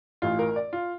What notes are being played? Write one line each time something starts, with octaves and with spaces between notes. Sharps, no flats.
A1 A2 E3 F4
A#4
D5
F4